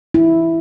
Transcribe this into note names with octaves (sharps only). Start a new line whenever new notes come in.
E4